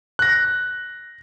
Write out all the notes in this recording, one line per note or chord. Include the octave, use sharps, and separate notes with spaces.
F#6 A#6